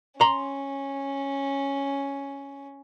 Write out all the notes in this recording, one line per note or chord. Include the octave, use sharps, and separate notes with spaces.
C#4 A#5 C6